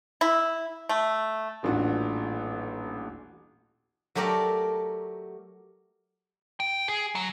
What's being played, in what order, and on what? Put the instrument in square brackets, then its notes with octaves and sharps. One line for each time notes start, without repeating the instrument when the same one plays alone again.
[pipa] E4
A3
[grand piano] D#1 A1 E3 D4 F4 F#4
[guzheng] F#3 A3 G4 A#4 D5
[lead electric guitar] G5
G#4
F#3